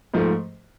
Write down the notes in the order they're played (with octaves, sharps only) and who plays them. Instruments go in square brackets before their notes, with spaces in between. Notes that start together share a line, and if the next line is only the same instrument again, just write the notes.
[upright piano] G#2 F3 A3